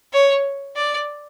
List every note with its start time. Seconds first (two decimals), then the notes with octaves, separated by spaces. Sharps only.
0.13 C#5
0.76 D5